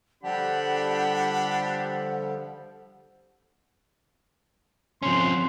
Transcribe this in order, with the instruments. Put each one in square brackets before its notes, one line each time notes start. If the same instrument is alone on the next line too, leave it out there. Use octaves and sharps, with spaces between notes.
[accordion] D3 F3 G3 [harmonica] D4 G4 [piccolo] F#5 [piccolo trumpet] B5
[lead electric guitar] F3 C#4 [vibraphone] C4 [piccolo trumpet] C6